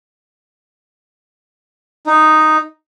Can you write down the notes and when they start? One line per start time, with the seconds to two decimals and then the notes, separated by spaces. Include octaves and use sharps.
2.07 D#4